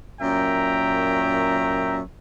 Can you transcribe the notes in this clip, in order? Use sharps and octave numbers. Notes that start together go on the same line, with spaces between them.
F#2 A#2 E5 G5 A#5